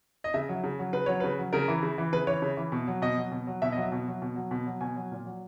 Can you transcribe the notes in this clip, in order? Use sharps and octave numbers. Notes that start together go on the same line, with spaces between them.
D#5
C#3 E5
F#3
C#3
F#3
C#3 B4
F#3 C#5
C#3 B4
F#3
C#3 A#4
E3
C#3
E3
C#3 B4
E3 C#5
C#3
E3
B2
F#3
B2 D#5
F#3
B2
F#3
B2 E5
F#3 D#5
E5
B2
F#3
B2
F#3
B2
F#3
B2 G#5
F#3
A#2
F#3